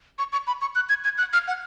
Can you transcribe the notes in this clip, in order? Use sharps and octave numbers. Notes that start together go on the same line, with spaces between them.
C#6
C#6
B5
C#6
F#6
G#6
G#6
F#6
F6
F#5